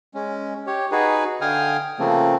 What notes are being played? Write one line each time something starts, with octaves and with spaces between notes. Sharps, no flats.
G#3 C#4
G4 C#5
D#4 F#4 G#4 B4
D3 F5 G5 G#5 D#6 F6
C#3 F3 A3 A#3 C4